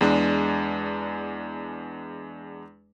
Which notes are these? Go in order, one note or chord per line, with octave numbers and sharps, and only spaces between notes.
E2 G#3 D4